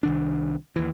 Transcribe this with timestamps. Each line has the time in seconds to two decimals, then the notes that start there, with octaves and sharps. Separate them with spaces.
0.03 C2 D#3 D4
0.76 D#2 E3